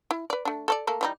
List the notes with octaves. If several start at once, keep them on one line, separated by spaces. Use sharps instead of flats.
E4
B4 D5
A3 D4
A4 C#5 D5
A3 A#3 A4
E3 G3 D#4